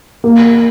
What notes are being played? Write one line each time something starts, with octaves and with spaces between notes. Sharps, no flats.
A#3